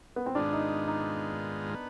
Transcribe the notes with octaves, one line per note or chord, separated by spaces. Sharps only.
B3
C4
G#2 D#3 G#3 B3 D4 F4
D#4
D#4
B3